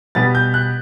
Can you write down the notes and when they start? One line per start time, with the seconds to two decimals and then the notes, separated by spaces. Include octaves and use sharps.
0.15 B2 G3 B3 A6
0.35 G6
0.54 F#6